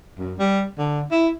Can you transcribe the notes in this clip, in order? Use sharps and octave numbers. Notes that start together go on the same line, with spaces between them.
F#2
G3
D3
E4